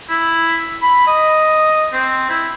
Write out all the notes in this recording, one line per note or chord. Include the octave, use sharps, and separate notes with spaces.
E4
B5
D#5
C4
E4